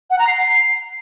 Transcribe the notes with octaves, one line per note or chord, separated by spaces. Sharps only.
F#5
A#5
C7